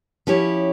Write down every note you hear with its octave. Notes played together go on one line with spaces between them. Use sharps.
F3 C#4 E4 G4 C#5